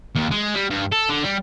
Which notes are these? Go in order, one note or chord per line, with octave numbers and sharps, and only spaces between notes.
D#2
G#3
G3
G2
A4
D3
G3